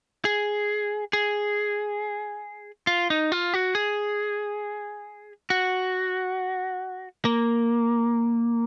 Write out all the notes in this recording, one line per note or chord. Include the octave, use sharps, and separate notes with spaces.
G#4
G#4
F4
D#4
F4
F#4
G#4
F#4
A#3